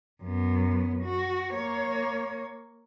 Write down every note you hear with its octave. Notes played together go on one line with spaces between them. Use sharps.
F#2 B3
F#4
A#3 C#5